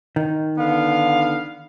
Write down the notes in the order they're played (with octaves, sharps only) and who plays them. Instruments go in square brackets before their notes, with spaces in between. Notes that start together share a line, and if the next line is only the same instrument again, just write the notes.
[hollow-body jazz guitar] D#3
[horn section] D3 B3 F5